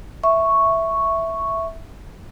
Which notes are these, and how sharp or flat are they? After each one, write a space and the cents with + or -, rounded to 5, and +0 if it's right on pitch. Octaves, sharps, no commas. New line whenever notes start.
E5 +0 C#6 +0